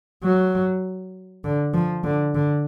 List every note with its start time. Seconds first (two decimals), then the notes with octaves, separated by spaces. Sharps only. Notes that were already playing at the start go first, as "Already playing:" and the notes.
0.24 F#3
1.45 D3
1.74 F3
2.04 D3
2.35 D3